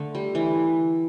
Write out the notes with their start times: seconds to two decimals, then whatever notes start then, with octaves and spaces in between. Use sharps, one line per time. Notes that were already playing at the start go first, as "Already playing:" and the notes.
Already playing: D3 A3
0.15 G3
0.35 E3